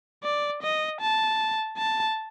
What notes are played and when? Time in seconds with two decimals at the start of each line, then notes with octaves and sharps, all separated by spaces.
0.23 D5
0.63 D#5
1.01 A5
1.78 A5